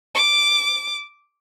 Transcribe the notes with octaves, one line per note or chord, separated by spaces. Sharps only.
D6